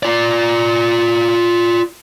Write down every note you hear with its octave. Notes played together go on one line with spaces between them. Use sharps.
F4 D5